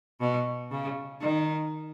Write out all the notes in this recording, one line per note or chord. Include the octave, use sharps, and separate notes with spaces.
B2
C#3
D#3